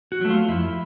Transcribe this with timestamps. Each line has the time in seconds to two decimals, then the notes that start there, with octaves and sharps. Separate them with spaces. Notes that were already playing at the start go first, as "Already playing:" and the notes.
0.12 F#4
0.21 F#3 A3
0.30 F4
0.48 F2 E4